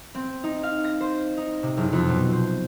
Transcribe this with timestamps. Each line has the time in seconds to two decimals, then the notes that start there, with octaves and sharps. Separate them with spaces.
0.15 C4
0.44 D#4
0.63 F5
0.84 A#6
1.01 C5
1.37 D#4
1.63 C3
1.77 F#1
1.93 F2
2.10 B2
2.33 C5